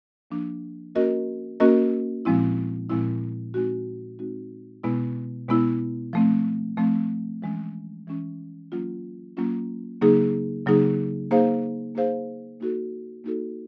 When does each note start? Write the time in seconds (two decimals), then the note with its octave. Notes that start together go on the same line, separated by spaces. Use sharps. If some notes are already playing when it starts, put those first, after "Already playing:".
0.30 F3 A#3 D4
0.95 A#3 C#4 F#4 A#4 D#5
1.60 A#3 C#4 F#4 A#4 D#5
2.25 A#2 F3 G#3 C4 E4
2.89 A#2 F3 G#3 C4 E4
3.54 G#3 C4 D#4 F#4
4.19 G#3 C4 D#4 F#4
4.83 B2 G#3 B3 E4
5.49 B2 G#3 B3 E4
6.13 F3 A3 C4
6.77 F3 A3 C4
7.42 E3 G#3 C#4
8.07 E3 G#3 C#4
8.72 F#3 A#3 C#4 F4
9.37 F#3 A#3 C#4 F4
10.01 C#3 F#3 A#3 D#4 G#4
10.66 C#3 F#3 A#3 D#4 G#4
11.31 A#3 D#4 G#4 C5 F5
11.95 A#3 D#4 G#4 C5 F5
12.60 A#3 D#4 F#4 A4
13.24 A#3 D#4 F#4 A4